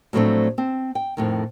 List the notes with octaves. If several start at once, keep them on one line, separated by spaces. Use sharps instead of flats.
A2 F3 F#3 A3 C4 D4
C4 A5
G5
F2 A2 D#3